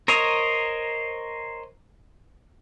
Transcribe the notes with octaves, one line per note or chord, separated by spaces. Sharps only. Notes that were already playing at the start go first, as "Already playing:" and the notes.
A#4 C5 C#5 D#5 A#5